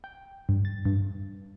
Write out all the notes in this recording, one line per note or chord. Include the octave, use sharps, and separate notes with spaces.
G5
G2
A6
G2